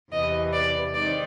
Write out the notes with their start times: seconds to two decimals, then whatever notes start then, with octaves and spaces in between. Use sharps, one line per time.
0.12 E2 C3 E3 D#5
0.53 D5
0.94 D#3 G#3 C4 D#4 D5